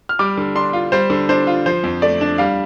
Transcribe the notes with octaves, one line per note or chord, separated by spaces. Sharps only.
F6
G3 D6
D3
D4 C6
F4
G3 C5
D3
D4 C5
F4
F3 C5
F2
A3 D5
D4
G3 F5